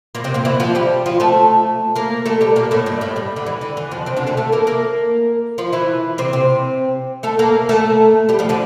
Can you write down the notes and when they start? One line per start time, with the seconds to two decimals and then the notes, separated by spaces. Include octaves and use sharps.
0.15 A#2 A#3
0.24 C3 C4
0.34 A#2 A#3
0.45 E3 E4
0.60 F3 F4
0.75 G3 G4
1.06 F3 F4
1.20 A3 A4
1.96 A#3 A#4
2.26 A3 A4
2.41 G3 G4
2.56 A#2 A#3
2.71 A2 A3
2.86 G2 G3
3.01 A2 A3
3.16 G2 G3
3.36 D3
3.46 E3
3.61 D3
3.77 E3
3.91 F2 F3
4.06 C3 C4
4.17 D3 D4
4.27 A3 A4
4.37 A3 A4
4.52 A#3 A#4
4.67 A#3 A#4
5.58 F3 F4
5.73 E3 E4
6.18 C3 C4
6.33 C3 C4
7.23 A3 A4
7.39 A#3 A#4
7.69 A3 A4
8.29 G3 G4
8.39 F3 F4
8.49 D3 D4